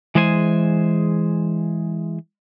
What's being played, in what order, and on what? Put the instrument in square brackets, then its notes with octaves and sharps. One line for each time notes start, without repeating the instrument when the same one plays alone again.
[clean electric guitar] E3 G#3 G#4 C5 D#5 G#5